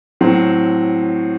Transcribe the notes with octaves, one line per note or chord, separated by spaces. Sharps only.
A2 F#3 C4